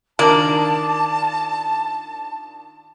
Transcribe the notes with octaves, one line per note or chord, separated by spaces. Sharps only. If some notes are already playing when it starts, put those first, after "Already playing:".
D#3 A#3 D4 F4 D5 A5